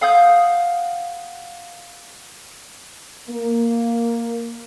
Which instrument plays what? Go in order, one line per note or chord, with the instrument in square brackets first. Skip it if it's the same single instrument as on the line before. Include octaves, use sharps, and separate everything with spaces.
[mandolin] F5 F#5 D#6 G6
[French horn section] A#3